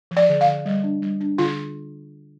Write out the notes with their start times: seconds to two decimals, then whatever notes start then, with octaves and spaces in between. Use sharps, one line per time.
0.11 F3
0.17 D5
0.29 D3
0.41 F5
0.47 D3
0.66 G3
0.84 D4
1.02 G3
1.21 D4
1.38 D3 F4